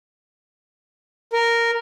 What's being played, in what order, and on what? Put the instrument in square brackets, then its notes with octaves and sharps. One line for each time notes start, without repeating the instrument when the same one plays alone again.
[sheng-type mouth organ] A#4